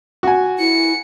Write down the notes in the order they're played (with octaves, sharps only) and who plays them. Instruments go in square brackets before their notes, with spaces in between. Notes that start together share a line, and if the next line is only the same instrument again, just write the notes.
[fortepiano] F#4 G#5
[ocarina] E4 [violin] C#7